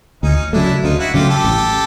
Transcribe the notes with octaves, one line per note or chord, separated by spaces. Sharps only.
D2 C#4 D#4
C#3 F#3 A3 D4 E4
D2 D#4 F4
E4 F#4
C#3 F#3 A3 F4 G4
G4 A4
A1